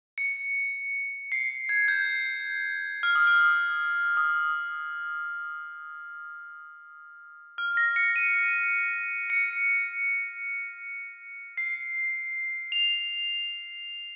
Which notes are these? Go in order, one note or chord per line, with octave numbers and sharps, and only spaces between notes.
C#7
C7
G#6
G6
F6
D#6
F6
D#6
F6
A#6
C#7
D#7
C#7
C7
F7